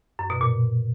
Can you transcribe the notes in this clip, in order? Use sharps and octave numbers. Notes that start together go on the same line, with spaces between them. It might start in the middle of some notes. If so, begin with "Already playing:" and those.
F#2
B2
A#2